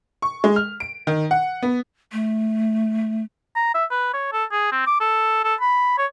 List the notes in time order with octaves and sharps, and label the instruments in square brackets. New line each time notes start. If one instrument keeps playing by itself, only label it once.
[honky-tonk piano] C#6
G#3
F6
D7
D#3
F#5
B3
[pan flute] A3
[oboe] A#5
E5
B4
C#5
A4
G#4
C4
D6
A4
A4
B5
C#5